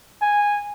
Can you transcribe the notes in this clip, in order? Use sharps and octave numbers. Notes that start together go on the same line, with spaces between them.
G#5